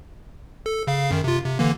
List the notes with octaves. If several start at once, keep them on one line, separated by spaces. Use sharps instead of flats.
A4
C#3 F5
F#2 D#3
C3 F4
C3
D3 E3 A#3